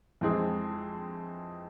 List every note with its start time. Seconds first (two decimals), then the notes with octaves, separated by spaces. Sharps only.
0.21 F2 E3 G#3 C4 G#4